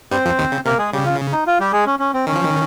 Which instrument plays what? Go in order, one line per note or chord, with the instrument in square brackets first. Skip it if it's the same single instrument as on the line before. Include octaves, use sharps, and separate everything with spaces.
[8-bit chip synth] G2 G3 [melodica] C4 C5
[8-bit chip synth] F2 F3
D#2 D#3
C#3
[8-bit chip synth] C3 [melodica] A#3 A#4
[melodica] G#3 G#4
[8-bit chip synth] C#3 [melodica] G3 G4
[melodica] F4
D#4
F4
G3 G4
G#3 G#4
C#4
C#4
C4
[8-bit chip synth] D#3 [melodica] C#4
[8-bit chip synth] F3
D#3